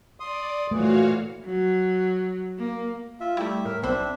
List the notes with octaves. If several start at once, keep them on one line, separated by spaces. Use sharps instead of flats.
D5 C6 D#6
A#2 E3 A3 F#4 C#5 F5
F#3
A#3
F4 E5
G3 A3 E4
A2 A#4
B1 C4 D4 C5 E5 B5